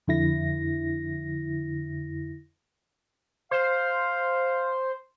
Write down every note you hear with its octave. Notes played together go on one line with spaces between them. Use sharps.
F2 D3 E4 A#6
C5 F5